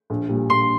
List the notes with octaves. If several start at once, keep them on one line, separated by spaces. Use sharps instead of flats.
A#1
A#2 G3
A#1 C6